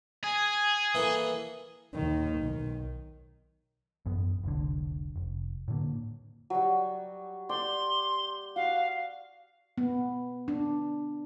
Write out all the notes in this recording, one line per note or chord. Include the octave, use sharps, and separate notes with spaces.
G#4 G#5
E3 A#3 A4
D#2 D#3
B1 D#3
A1 F#2 B3
F1 C2 D3
F1
A2 D3 A#3
F#3 G3
D5 G5 C6
F#4 F5
B3
D4